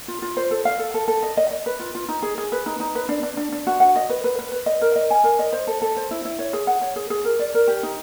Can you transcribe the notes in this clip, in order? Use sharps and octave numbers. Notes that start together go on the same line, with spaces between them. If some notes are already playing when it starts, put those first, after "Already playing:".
F4
F4
C5
A4
F5
A4
A4
A4
D#5
D#5
D#5
B4
F4
F4
D#4
G#4
G#4
B4
D#4
D#4
B4
D4
D4
D4
D4
F#4
F#5
D#5
B4
B4
B4
B4
D#5
A#4
D#5
G#5
A#4
D#5
C5
A4
A4
C5
E4
E4
C#5
G#4
F#5
C#5
G#4
G#4
A#4
D5
A#4
G4
D#4